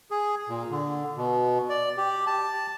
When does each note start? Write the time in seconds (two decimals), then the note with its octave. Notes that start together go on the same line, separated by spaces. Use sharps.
0.11 G#4
0.49 A#2
0.71 D3
1.17 B2
1.70 D5
1.97 G4
2.27 A5